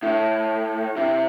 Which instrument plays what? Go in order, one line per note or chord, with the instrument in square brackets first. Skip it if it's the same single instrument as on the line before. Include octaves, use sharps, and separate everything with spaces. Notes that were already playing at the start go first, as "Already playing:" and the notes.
[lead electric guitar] A2 [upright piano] E4
[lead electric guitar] C3 [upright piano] E4